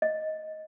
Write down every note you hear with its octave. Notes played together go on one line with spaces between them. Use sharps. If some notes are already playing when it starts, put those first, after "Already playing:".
D#5